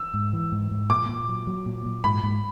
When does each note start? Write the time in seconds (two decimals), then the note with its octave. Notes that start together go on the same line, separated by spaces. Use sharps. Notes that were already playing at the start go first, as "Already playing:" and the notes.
Already playing: E6
0.14 G#2
0.33 E3
0.52 G#2
0.71 G#2
0.90 A#2 D6
1.09 A#2
1.29 F#3
1.47 F#3
1.66 A#2
1.86 A#2
2.04 G#2 B5
2.23 G#2